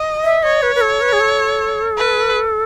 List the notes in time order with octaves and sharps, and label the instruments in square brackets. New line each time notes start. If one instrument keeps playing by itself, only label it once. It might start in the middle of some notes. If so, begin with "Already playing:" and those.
Already playing: [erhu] D#5
[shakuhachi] E5
[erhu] C#5 [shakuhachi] D#5
[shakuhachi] B4
B4
A4
B4
G#4
A4
[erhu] B4